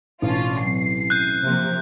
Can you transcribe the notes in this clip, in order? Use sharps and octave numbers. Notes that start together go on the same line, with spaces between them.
A1 B2 C#4 D4 F4
F#3 C4 C7
F#6 G6
C3 F3 A#3